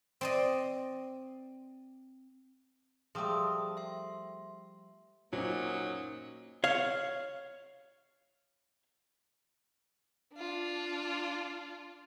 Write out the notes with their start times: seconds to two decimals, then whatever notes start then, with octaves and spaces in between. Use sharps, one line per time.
0.21 C4 D5 D#5
3.15 F3 G3 A3 G#4 D#6
3.77 E5 C6
5.33 A#2 F#3 A#3 C#4 D#4 C5
6.64 C#5 F5
10.35 D4 F4